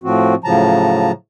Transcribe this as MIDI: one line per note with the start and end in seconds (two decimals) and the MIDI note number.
0.04 0.35 45
0.04 0.35 53
0.04 0.35 60
0.04 0.35 66
0.44 1.12 45
0.44 1.12 49
0.44 1.12 53
0.44 1.12 54
0.44 1.12 81
0.44 1.12 82